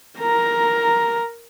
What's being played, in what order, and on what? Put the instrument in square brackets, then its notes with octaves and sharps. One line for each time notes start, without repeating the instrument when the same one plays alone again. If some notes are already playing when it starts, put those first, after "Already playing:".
[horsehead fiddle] A#4 A#5